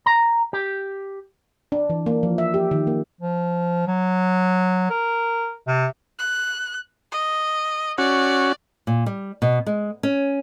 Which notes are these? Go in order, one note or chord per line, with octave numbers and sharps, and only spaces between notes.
A#5
G4
D4
E3
A#3
F3
E5
G4
D#3
A#3
F3
F#3
A#4
C3
F#6
D#5
C#4 F#4 D5
A#2
G3
B2
G#3
C#4